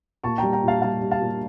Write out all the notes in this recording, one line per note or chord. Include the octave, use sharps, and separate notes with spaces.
A#2 A5 C#6
G3 G5 A#5
G5 A#5
A#2 F5 A5
G3 F5 A5
G3
F5 A5
A#2